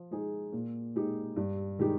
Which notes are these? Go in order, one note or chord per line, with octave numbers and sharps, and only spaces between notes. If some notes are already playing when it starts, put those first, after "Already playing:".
Already playing: F3
G#3 D#4 G#4
A#2
G#3 D#4 G4
G2
D#3 G#3 D#4 G4